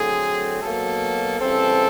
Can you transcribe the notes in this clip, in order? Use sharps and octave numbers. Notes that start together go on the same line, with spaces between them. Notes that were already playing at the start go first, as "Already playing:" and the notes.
Already playing: D3 F#3 A3 C4 G#4
B2 F#3 A#3 A4
C#3 E3 G3 C4 A4